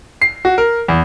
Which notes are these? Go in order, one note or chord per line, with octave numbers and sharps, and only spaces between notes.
C7
F#4
A#4
E2